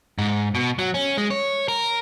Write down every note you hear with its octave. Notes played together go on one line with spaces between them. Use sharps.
G#2
B2
F#3
C#4
G#3
C#5
A#4